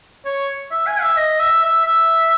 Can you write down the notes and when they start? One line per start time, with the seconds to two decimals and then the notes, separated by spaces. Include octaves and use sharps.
0.25 C#5
0.71 E5
0.87 G#5
1.02 E5
1.17 D#5
1.40 E5
1.63 E5
1.85 E5